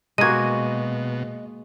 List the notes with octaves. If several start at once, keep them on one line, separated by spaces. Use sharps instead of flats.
B2 G#3 A#3 F#4 D#5 G#6 D#7